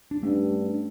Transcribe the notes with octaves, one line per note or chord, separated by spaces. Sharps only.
D4
G2 A3 C#4